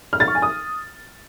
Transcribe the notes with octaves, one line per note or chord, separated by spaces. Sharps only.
F6
A6
C#6
G#5
D#6